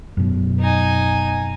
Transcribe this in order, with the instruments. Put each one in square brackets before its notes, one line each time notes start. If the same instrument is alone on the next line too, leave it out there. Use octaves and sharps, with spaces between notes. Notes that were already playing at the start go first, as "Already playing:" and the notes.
[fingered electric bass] F#2 B2
[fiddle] D#4 G#5